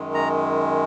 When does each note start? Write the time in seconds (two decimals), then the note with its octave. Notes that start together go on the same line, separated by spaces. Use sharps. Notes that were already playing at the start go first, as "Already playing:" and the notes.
Already playing: F#2 D#3 G#3
0.14 A#5